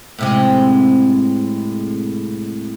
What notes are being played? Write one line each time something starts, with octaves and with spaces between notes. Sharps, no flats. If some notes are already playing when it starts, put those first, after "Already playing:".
A2 C3 G#3